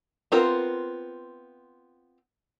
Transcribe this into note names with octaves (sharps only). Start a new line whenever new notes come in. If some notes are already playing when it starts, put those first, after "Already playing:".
B3 C4 F4 A#4